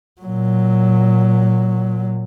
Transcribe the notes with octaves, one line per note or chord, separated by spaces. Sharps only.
A#2 F#3